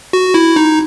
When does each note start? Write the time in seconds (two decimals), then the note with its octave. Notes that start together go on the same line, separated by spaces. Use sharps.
0.13 F#4
0.34 E4
0.56 D#4